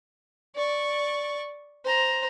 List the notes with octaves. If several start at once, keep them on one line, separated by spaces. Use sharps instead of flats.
D5 C#6
C5 A#5